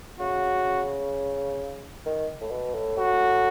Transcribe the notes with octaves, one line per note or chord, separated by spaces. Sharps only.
C#3 F#4
D#3
A2
B2
A2
A2 F#4